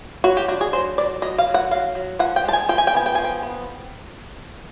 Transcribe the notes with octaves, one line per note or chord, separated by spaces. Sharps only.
F#3 F#4
G4
D4 F#4
G#4
F#3 C5
F#3 D5
F#3 D#5
F5
F#3
F#5
F#3 F5
F#3
F3 F#5
G5
G#3 A5
G#5
F3 G5
G#5
G5
B3 G#5
G5
F3 G#5
G5
B3